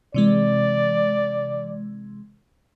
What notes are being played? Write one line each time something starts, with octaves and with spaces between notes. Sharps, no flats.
C3 E3 G#3 D5